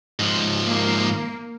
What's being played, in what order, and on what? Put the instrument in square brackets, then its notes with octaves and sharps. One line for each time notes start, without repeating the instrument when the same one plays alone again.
[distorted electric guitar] G#2 F3
[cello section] A#3